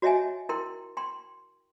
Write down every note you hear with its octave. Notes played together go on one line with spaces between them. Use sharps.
F#4 C#5 D#5 E5 G5 G#5
E4 A#4 G5 C6
G5 C6